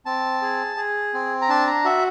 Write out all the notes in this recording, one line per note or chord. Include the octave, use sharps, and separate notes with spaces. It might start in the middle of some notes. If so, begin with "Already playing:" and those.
C4 A5
G#4
G#4
C4
A#5
D4 A5
A#5
F#4 E5